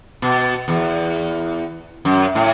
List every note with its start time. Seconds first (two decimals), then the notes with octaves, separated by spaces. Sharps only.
0.22 B2
0.68 E2
2.05 F#2
2.35 A2